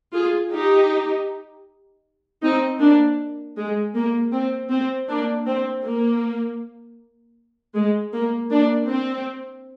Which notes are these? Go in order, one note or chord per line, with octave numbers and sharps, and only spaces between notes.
F4 G#4
D#4 G4
C4 D#4
A#3 D4
G#3
A#3
C4
C4
A#3 D4
C4
A#3
G#3
A#3
A#3 D4
C4